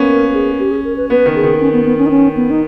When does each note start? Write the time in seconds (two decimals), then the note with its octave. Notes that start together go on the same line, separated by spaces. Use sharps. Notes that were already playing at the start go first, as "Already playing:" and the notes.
Already playing: A#3 B3 C#4
0.09 A#4
0.33 G#4
0.59 G4
0.71 G#4
0.84 A#4
0.97 B4
1.10 B3 B4
1.26 D#3
1.35 G#4
1.43 D#3
1.60 C#4
1.73 B3
1.85 B3
1.98 C#4
2.06 D#4
2.11 C#4
2.36 B3
2.50 D#4